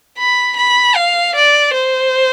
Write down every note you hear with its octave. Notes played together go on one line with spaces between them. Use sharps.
B5
B5
F5
D5
C5